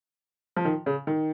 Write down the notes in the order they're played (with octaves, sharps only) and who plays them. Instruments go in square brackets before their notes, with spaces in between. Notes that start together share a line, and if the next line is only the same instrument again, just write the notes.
[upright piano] F3
D#3
C#3
D#3